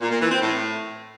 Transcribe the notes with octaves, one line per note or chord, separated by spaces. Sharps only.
A#2
A#2
E3
C4
A2